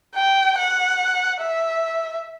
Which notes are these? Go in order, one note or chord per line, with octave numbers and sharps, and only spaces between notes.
G5
F#5
E5